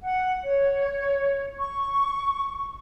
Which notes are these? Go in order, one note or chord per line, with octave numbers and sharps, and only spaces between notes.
F#5
C#5
C#6